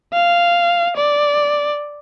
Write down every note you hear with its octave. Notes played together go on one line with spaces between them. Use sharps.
F5
D5